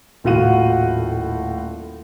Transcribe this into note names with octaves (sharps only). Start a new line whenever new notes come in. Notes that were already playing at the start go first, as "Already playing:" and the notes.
D#1 A2 F4 F#4 F#5 D#7